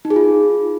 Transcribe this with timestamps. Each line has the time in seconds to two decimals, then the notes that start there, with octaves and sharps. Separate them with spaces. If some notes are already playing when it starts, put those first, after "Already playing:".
0.05 D#4
0.10 G#4
0.16 F4